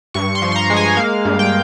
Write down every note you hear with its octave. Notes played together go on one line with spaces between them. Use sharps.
G2 C#6
C6
F3
C6
A#5
G#3
G#5
A#3 F5
G2
G5